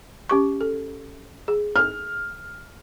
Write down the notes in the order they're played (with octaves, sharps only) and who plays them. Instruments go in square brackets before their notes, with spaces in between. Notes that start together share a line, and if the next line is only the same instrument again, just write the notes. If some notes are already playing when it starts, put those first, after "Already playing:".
[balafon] C#4 G4 C#6
A4
G#4
[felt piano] F6